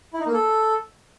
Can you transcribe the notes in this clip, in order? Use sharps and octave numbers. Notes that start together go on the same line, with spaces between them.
E4
D#4
A#3
A4